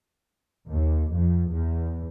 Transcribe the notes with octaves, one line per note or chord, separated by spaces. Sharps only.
D#2
F2
E2